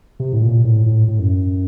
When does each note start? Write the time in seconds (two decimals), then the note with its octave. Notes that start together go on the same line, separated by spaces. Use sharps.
0.20 C3
0.32 A2
0.42 A#2
0.64 A2
0.86 A2
1.08 A2
1.19 F#2